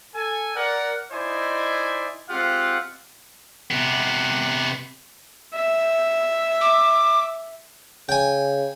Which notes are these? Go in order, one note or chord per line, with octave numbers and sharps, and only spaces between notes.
A4 G#5
A#4 D5 F#5
D#4 E4 C5 D5 D#5 G#5
G#3 C4 F4 G4 F5 F#5
C3 B3
E5
D6
C#3 G5 G#5